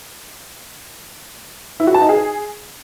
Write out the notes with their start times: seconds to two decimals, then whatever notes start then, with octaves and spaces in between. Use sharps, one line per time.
1.80 E4
1.87 F#4
1.94 A5
2.02 D#4
2.09 G#4